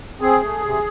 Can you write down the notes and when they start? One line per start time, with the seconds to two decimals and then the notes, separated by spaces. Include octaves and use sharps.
0.21 C4 G#4
0.42 A3
0.62 C3